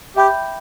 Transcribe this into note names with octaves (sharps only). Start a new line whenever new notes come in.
G4 E5 G5 B5 D6 G6